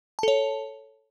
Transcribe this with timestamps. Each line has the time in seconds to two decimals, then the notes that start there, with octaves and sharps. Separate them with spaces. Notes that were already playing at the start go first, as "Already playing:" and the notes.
0.19 A5
0.23 A4
0.28 C#5